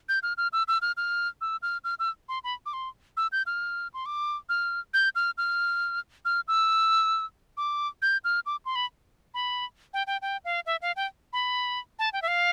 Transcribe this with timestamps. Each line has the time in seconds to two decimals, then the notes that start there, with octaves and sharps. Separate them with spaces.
0.09 G6
0.23 F6
0.38 F6
0.53 E6
0.68 E6
0.82 F6
0.97 F6
1.41 E6
1.62 F6
1.84 F6
1.99 E6
2.29 C6
2.44 B5
2.66 D6
2.73 C6
3.17 E6
3.32 G6
3.46 F6
3.94 C6
4.06 D6
4.49 F6
4.94 G6
5.15 F6
5.38 F6
6.25 F6
6.48 E6
7.57 D6
8.02 G6
8.24 F6
8.46 D6
8.65 C6
8.75 B5
9.34 B5
9.93 G5
10.07 G5
10.22 G5
10.45 F5
10.66 E5
10.82 F5
10.96 G5
11.33 B5
11.99 A5
12.13 G5
12.22 E5
12.28 F5